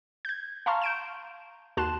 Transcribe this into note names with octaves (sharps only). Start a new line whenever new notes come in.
G6 G#6
F5 A5 A#5 C6 C#6 F6
G6 D7 E7
D#2 F#4 A5 C6 F#6 E7